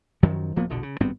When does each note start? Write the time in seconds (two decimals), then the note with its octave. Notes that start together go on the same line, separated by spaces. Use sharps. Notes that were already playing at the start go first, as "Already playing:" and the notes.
0.23 F#2 D#3 F3 F#3
0.56 D1 F3 A#3 B3
0.70 E1 A#1 B2 D3
0.83 C#3
1.00 G#1 G2 B3 C4